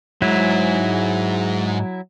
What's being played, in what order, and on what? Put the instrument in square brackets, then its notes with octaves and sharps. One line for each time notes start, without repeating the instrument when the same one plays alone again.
[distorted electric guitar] G#2 [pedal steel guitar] F#3 E4